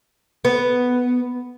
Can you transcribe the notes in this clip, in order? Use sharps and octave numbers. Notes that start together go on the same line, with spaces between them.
B3